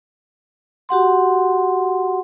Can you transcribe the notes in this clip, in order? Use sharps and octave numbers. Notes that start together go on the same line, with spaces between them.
F#4 G4 F#5 C6